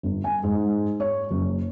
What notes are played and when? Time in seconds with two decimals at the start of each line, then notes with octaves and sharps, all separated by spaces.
0.03 G1
0.24 G#5
0.43 G#2
1.00 C#5
1.31 F#1